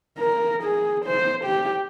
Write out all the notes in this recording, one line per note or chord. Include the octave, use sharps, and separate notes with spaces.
A#4
G#4
C5
G4